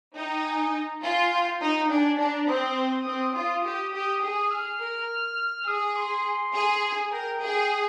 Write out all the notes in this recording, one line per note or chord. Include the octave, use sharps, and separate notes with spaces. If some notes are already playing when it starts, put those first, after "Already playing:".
D#4 G5
G#5
A#5
F4 G#5
G5
D#4
D4 G#5
D4 A#5
C4 D#6
C4
F4 D#6
G4
G4
G#4 D#6
F6
A#4
G#4 D#6
C6
G#4
G#5
A#4 G5
G#4